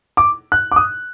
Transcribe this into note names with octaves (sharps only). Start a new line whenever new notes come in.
D6
F#6
D6
D#6